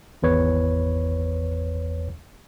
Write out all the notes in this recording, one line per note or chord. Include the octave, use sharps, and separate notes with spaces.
G#1 E2 B4 C#5